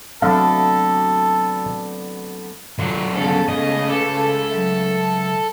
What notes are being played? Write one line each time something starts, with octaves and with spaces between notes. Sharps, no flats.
D3 F#3 A3 B3 C4 A4 E5 F5
D2 D3 F#3 F4
C#3 A3 B3 A4
C#2 D#5
A4 B4 D6
F#3 E5